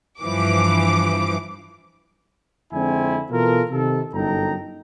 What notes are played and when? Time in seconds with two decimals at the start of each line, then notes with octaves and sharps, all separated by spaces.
0.22 G2 E3 F3 D6
2.73 F2 D3 G#3 C4 E4 G#5
3.31 B2 E3 F4 A4 A#4
3.71 C3 D#3 A4
4.14 G1 F#2 D#4 A4 G5 A#5